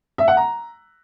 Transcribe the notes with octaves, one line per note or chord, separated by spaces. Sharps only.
E5
F#5
A#5